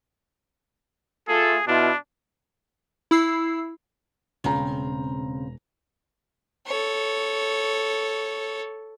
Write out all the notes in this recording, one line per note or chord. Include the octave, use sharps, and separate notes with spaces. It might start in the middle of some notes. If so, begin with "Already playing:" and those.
A3 F4 G#4 A4
B2 D4 E4 F4
E4 E6 C7
E1 C#3 C4 F5 A#5
A4 C#5